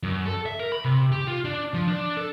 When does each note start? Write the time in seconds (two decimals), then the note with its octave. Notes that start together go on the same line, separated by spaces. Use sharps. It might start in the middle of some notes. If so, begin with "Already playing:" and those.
0.03 F#2
0.26 A4
0.46 E5
0.59 A#4
0.72 B5
0.85 C3
1.12 G4
1.27 F4
1.45 D4
1.74 F3
1.88 D4
2.17 A4